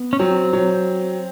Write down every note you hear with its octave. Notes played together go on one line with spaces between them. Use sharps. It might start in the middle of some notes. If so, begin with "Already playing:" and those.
Already playing: B3
C#4
F#3 C4
F#3